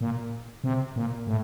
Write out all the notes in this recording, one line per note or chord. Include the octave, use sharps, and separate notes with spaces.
A#2
C3
A#2
A2